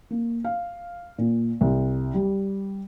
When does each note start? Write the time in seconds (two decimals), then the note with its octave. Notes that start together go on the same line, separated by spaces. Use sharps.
0.11 A#3
0.45 F5
1.18 A#2
1.61 C2
2.14 G3